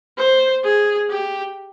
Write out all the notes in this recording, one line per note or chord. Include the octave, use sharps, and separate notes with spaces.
C5
G#4
G4